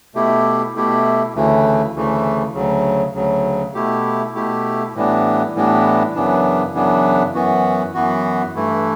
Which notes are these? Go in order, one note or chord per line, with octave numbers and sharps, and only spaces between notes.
B2 A3 E4 G4
B2 A3 E4 G4
D2 C#3 E3 A3
D2 C#3 E3 A3
D2 C#3 F#3
D2 C#3 F#3
B2 A3 E4 G4
B2 A3 E4 G4
A2 E3 G3 B3 D4
A2 E3 G3 B3 D4
F#2 C#3 E3 B3 D4
F#2 C#3 E3 B3 D4
F#2 E3 B3 F#4
F#2 E3 B3 F#4
G2 E3 A3 E4